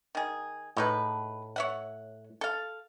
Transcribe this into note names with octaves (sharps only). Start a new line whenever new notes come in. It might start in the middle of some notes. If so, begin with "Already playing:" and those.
D#3 G#4
A2 G#3 D#4 B4
C#5 E5 F#5
A4 F5